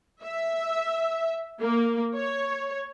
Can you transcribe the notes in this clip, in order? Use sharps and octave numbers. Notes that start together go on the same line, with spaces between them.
E5
A#3
C#5